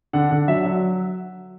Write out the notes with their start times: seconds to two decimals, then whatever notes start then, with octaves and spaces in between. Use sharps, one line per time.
0.13 D3 F#5
0.31 D3
0.47 F#3 E5
0.65 F#3